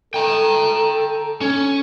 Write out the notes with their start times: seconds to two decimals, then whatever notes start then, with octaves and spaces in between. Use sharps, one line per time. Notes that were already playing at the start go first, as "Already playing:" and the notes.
0.14 A4 G5 A#5
1.41 C#4